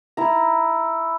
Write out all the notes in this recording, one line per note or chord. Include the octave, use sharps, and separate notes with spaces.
E4 A#5